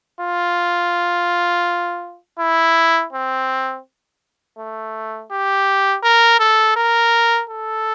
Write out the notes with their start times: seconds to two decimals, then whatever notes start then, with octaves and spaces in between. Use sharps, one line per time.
0.20 F4
2.39 E4
3.12 C4
4.58 A3
5.31 G4
6.03 A#4
6.39 A4
6.76 A#4
7.50 A4